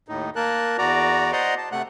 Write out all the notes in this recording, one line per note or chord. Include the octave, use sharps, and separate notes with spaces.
D#2 A2 D#4
A#3 A#4 A5 F#6
E2 F#4 D5 A#5 D6
C5 D5 D#5 F#5 A#5 C6
A5
C3 A3 F#5 F#6